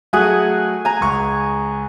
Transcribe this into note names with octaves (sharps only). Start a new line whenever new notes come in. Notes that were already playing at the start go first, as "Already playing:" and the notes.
F#3 A3 F#4 G#4 F#5 G#5
G#5 A#5
C#2 C#6